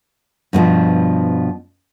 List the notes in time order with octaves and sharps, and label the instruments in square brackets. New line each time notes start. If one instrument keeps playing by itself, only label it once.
[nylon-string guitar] G2 B2 E3 F3